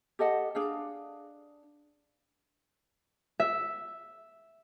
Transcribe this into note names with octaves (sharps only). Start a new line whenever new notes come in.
G4 A4 D#5 F#5
D4 G#4 F5
E5